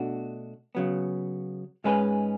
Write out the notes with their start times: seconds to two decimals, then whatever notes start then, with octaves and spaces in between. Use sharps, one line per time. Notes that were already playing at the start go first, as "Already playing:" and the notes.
Already playing: B2 A3 D4 F#4
0.75 C#3 F#3 B3
1.84 G#2 G#3 C#4 G#4 B4